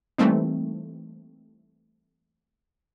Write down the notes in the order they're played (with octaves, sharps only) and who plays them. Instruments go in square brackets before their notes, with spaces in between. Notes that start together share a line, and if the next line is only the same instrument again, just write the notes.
[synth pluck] E3 G3 A3 A#3 C4 D#4